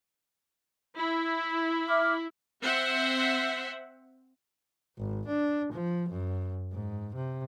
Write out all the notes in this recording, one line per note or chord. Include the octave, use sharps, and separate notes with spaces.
E4
E5 D6 F6
C4 C5 E5 F#5
G#1
D4
F3
F#2
G#2
C3